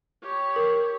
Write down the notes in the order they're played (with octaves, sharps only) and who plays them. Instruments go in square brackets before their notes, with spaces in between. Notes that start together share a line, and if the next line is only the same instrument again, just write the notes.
[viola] G4 C#5
[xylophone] A#4